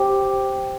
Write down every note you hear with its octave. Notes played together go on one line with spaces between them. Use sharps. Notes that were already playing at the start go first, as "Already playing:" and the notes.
Already playing: C4 G4